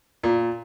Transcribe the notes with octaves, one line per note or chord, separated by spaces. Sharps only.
A#2